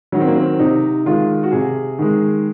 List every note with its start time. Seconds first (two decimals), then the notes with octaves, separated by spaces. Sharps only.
0.12 D#3 F#3 C#4
0.20 C4
0.27 A#3
0.35 C4
0.59 C3 D#4
1.06 D#3 G#3 F4
1.43 F#4
1.52 C3 G#4
1.99 D#3 G#3